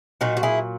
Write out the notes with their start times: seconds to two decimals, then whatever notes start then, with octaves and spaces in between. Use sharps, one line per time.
0.21 A#2 F#3 D#4 F#4
0.37 F#4
0.43 E4 G#4